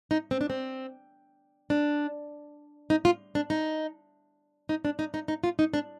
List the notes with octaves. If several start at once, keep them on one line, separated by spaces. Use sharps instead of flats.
D#4
C4
D4
C4
D4
D#4
F4
D4
D#4
D#4
D4
D#4
D#4
D#4
F4
D#4
D4